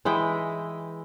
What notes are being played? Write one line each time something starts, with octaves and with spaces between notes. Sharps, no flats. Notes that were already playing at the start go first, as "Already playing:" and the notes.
E3 G#3 E4 G5